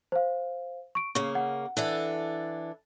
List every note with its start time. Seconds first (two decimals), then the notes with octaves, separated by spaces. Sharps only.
0.12 C5 F5
0.95 C#6 D7
1.15 C#3 A#3 C#6
1.35 F#5
1.77 E3 D4 A4